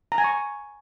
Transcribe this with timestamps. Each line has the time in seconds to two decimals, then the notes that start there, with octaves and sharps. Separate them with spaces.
0.12 A#5
0.18 G#5
0.24 C#6